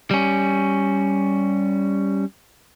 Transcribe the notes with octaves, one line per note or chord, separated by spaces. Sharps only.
G3 C#4